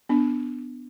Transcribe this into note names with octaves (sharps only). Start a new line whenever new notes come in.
B3 D4